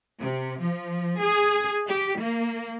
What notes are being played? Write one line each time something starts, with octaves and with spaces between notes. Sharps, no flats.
C3
F3
G#4
G4
A#3